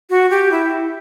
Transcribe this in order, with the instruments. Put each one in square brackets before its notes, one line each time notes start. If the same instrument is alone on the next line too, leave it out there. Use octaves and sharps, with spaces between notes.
[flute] F#4
G4
E4